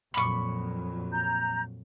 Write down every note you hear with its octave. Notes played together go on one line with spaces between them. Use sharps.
F2 A#2 F#3 B5 C#6
A#5 G6